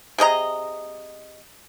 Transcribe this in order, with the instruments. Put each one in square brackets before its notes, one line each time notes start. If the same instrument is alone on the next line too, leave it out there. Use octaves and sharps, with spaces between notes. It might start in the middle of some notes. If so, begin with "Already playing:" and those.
[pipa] C3 G#4 D#5 A#5